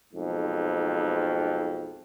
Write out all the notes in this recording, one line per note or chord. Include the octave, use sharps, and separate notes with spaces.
B1 F2 G#2